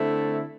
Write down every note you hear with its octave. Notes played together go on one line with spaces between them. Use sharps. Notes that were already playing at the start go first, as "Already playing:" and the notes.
Already playing: D3 A3 C4 E4